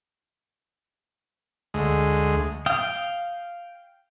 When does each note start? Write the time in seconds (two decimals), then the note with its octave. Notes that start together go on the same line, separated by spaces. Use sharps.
1.74 D2 G#3
2.66 F5 G5 D#6